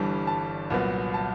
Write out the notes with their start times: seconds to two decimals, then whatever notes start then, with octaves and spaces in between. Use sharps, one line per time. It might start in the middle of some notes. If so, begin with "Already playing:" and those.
Already playing: G1 G2 E3 G3 A5
0.27 A5
0.70 C2 A#2 F#3 B3
1.14 A5